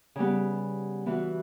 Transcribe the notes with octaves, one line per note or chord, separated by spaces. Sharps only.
C#3 G3 B3
E3 B3 F#4